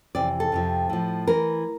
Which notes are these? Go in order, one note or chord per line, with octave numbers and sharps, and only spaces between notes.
F2 C3 E3 D5
A4
F2 C3 F3
A2 F3
E3 A#4